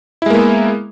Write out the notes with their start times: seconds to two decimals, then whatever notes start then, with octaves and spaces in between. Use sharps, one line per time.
0.22 E4
0.26 G#3
0.30 A#3
0.34 B3